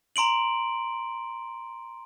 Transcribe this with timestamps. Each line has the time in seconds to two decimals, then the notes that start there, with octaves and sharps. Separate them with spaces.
0.16 A#5 C6 D7 F#7